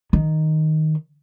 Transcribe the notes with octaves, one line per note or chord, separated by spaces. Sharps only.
D#3